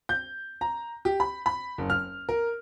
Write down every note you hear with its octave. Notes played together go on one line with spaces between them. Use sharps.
G6
A#5
G4
B5
B5
F#1
F6
A#4